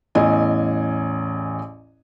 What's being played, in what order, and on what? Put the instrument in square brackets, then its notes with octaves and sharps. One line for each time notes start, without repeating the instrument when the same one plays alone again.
[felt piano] A1 E2 D#5 G#5